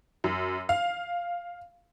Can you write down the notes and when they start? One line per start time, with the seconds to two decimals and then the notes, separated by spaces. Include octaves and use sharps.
0.24 F#2
0.69 F5